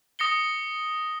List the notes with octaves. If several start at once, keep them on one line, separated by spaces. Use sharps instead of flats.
D#6 A#6 C#7 G7